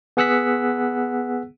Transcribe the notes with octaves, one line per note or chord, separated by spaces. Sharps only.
B3 G#4 F#5 E6 F#6 B6